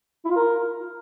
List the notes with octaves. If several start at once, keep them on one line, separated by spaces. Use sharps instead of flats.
E4
F4
A#4